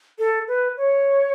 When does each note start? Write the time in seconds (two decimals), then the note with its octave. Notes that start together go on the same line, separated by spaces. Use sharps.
0.19 A4
0.48 B4
0.77 C#5